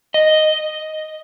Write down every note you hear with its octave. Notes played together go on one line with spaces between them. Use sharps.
D#5